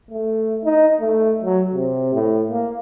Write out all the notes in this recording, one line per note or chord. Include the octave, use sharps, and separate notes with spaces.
A3
D#4
A3
F#3
C3
A2
A#3